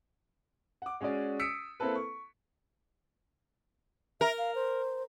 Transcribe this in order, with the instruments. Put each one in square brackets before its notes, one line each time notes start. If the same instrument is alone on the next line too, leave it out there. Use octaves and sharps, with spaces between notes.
[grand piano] F#5 D6
G#3 C#4 F#4 G#4 D5
D#6 E6 B6 C#7 D7
A#3 C4 E4 A4 B4
C#6
[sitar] A#4 [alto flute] E5
[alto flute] F5
C5